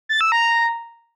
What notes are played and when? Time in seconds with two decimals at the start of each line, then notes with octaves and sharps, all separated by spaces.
0.09 A6
0.21 E6
0.32 A#5